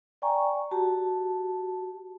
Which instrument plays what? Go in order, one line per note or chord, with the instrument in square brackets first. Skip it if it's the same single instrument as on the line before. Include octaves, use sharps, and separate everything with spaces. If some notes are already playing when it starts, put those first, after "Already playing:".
[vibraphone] D5 G5 G#5 A#5 C#6
F#4 G4 A5